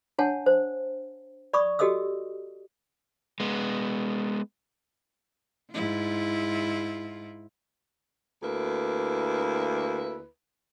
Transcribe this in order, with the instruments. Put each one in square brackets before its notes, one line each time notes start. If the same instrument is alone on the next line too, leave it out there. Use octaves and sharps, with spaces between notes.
[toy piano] D4 C#5 F#5 G#5 A5
C5
D5 B5 C#6 D#6
F#4 G4 A4 D#5 D#6 E6
[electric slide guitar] G#3 B3
[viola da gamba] G#2 E4 F4
[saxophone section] D2 A#3 E4 B4